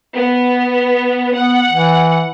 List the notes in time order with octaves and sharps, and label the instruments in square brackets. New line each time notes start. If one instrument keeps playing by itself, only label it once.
[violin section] B3
[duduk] B3 [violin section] F#5
[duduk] E3